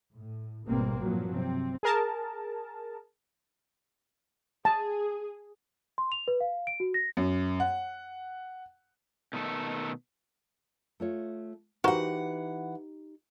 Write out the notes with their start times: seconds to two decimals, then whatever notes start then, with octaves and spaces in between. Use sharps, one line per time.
0.15 A2
0.67 G#1 B2 D#3 G3 A#3 C4
0.98 G2 A#2 F3 F#3
1.34 C3 C4
1.83 G#4 A#4 A5
4.65 G#4 A5
5.98 C6
6.12 F7
6.28 B4
6.40 F5
6.67 D7
6.80 F#4
6.94 A#6
7.17 F#2
7.60 F#5
9.33 B2 D#3 A3 A4
11.00 A3 F4 C#5
11.84 E3 D#4 F#4 G4 A#4 C5 F#5